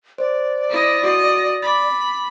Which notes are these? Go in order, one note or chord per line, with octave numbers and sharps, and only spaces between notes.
C5 D5
E4 D#5
F#4 D#5
B5 D6 A6